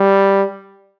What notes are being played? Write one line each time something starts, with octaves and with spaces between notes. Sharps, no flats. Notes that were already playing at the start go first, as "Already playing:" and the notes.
Already playing: G3